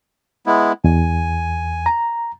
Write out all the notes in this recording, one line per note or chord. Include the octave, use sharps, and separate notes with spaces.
G#3 B3 E4
E2 G#5
A#5